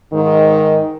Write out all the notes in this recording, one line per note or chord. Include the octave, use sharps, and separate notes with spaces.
G#2 D#3